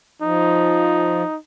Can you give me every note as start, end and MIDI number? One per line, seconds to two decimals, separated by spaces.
0.22 1.23 53
0.22 1.37 63